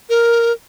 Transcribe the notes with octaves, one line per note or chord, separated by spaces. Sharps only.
A#4